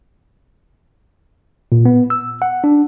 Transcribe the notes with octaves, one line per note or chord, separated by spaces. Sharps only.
A#2
B3
E6
F#5
D4